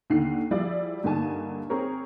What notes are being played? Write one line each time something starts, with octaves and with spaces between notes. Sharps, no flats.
D#2 D3 C7
F3 G3 E4 F4 G#4 D5
G2 D3 A#3 D#4 G#5 A5
C4 G#4 A#4 C#5